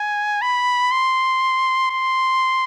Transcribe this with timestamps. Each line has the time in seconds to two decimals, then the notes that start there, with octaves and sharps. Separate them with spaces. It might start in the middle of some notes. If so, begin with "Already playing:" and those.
Already playing: G#5
0.42 B5
0.92 C6
1.90 C6